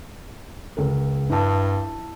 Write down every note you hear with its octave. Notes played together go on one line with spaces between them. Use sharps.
C#2 A#4
G2 E4 A5